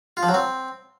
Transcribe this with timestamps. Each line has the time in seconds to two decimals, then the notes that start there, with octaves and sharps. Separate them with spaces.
0.17 F4
0.23 F3
0.28 F#3
0.34 C4